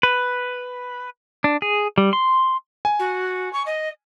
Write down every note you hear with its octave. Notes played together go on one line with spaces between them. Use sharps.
B4
D4
G#4
G3
C6
G#5
F#4
C#6
D#5